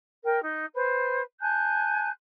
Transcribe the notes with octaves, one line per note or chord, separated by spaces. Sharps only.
A#4 G5
D#4
B4 C5
G#5 A5 F#6 G6